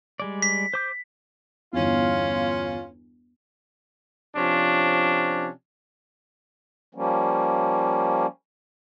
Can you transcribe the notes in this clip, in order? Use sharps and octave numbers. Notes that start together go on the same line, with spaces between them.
G3 G#3 D5
B6
C5 D6 G6
G1 E2 C#4 F4
C3 F3 C#4 D4
F3 G3 A#3 C#4